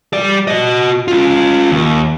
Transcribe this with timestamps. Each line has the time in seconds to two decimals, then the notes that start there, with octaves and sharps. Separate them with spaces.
0.13 G3 D5
0.48 F#4 D#5
1.08 C#4 F4
1.70 D#2